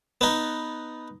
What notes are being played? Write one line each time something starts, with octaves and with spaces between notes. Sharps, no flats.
B3 D#4